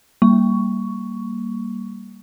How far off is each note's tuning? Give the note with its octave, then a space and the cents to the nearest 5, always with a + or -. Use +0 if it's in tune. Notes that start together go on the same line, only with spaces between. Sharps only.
G3 +0 A#3 +0 C#6 +10